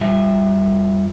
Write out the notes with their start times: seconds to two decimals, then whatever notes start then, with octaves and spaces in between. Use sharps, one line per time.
0.01 F2 G3 F4 E5